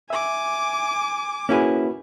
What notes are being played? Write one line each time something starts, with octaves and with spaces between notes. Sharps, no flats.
E5 G#5 D6
A#3 C#4 E4 F#4 G#4 B4